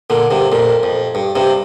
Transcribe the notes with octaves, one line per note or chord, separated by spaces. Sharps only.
A#2 D3
G2 C3
F2 A#2
F2
G2
G2 C3